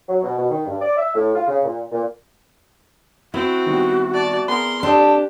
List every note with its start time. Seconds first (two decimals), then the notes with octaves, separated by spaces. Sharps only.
0.08 F#3
0.23 B2
0.37 B2
0.49 D#3
0.66 G2
0.81 D5
0.97 E5
1.15 A2
1.35 F4
1.47 C#3
1.64 A#2
1.92 A#2
3.34 C4 E4 F#4
3.67 D#3 G3 B3
4.14 D5 A5
4.48 B3 G#4 A#4 B4 C6
4.83 C4 D4 G4 A4 D#5 A5